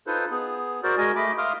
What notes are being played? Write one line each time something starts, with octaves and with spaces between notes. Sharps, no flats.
D#4 F4 A4 B4 C5
B3 G#4
F#4 A#4 C5 D5
G#3 F#4 A#4 D#5 G#5
A3 D#5 B5 D6
E5 F5 C6 D6 D#6 F6